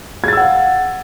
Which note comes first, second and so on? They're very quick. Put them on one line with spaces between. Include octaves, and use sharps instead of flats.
G#6 A6 E6 F#5 F5